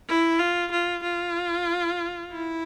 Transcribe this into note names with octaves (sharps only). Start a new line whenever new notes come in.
E4
F4
F4
F4
E4